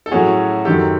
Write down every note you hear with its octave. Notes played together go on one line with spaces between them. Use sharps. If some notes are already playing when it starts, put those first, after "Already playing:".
A4
A2 F#3 A3 C#4 F#4 G#4
F#2 D#3 F#3 G4 A4